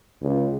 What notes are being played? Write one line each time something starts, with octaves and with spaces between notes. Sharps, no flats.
C#2